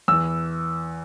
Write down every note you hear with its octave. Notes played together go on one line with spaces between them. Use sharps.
E2 E3 E6